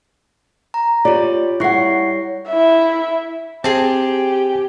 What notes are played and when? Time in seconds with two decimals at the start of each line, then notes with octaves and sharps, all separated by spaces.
0.74 A#5
1.05 F4 G4 C#5 D5
1.60 G3 E4 C#5 F#5 C#6 C7
2.48 E4 E5
3.64 C4 G4 G#4 A5